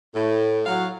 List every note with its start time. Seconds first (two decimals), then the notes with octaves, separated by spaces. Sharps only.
0.14 A2
0.66 F#3 F5